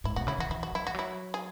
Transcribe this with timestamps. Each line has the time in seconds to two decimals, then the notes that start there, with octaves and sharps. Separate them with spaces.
0.04 G#2 E4
0.16 B2 F#4
0.27 C#3 E4
0.38 E3 F#4
0.50 E3 E4
0.63 F#4
0.73 F#3 E4
0.87 E3 F#4
0.95 F#3 E4
1.34 G#4